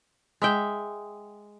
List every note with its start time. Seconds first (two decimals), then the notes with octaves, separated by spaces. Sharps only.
0.42 G#3 E5 G5